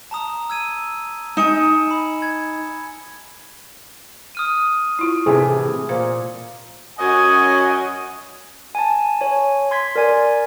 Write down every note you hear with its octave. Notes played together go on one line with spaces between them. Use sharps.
A5 A#5 D#6
E6 G#6 D#7
D#4 G#5 C#7 E7
B5
G#6
D#6 F6 D#7
E4 F4
A2 C3 E3 G#4 G#5
A#2 C5 F5
F#2 C#4 F#4 D#5 F#5 G#5
G#5 A5
C#5 G#5
C6 G#6 B6
A#4 D5 G#5 G#6